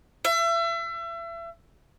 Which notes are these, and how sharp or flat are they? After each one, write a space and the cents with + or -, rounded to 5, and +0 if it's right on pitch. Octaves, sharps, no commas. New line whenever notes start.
E5 +35